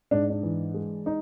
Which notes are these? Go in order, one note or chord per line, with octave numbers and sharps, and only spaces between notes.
G#2 D4
D4
E3
G#3
D#4